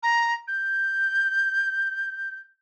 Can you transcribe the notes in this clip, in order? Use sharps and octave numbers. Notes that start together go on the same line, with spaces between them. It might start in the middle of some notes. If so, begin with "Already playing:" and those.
A#5
G6